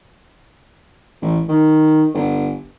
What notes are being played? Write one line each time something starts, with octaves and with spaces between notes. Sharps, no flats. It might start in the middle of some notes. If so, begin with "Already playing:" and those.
A1
D#3
G1